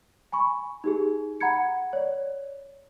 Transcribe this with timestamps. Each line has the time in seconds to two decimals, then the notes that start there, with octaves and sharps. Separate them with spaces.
0.32 G#5 B5 C#6
0.84 D#4 G4 G#4
1.40 F#5 A#5 B5 G#6 C#7
1.93 C#5 D5